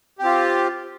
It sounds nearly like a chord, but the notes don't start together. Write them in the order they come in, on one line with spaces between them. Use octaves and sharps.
G4 C4 F4